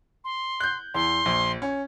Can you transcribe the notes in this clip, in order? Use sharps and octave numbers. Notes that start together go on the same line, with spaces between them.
C6
F#6 G6
E2 C6
A#1
C#4